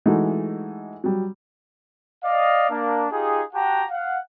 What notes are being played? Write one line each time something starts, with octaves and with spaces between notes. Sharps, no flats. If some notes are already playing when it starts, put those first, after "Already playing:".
E3 G#3 A3 D#4 F#4
F#3 G3
D5 D#5 F5
A#3 D4
D#4 F4 G4 G#4
F#4 G4 F#5 G5 A5 A#5
F5 F#5